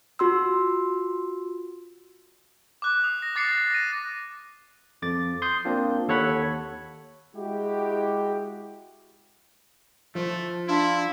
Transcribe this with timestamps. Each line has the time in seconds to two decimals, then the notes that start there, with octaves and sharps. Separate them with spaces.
0.19 F4 F#4 C6 E6
2.82 D6 F#6
3.04 D#6
3.22 A#6
3.36 D6 A6 C7 C#7
3.51 A6
3.70 A#6 D#7
5.02 F2 D6 A6
5.42 C6 D#6 G6
5.65 A#3 C4 D4 F4
6.08 D#2 A4 C#5 F#5 B5 G#6
7.35 G#3 E4 F#4 G4
10.15 F3 A3
10.68 D4 E4 F4